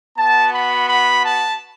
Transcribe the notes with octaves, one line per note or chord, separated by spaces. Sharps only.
B3 F#4 A5
B5
B5
A5